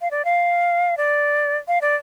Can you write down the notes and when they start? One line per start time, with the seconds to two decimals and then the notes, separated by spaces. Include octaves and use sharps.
0.01 F5
0.11 D5
0.25 F5
0.97 D5
1.68 F5
1.81 D5